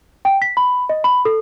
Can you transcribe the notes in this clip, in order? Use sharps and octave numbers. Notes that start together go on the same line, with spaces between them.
G5
B6
B5
D#5
B5
A4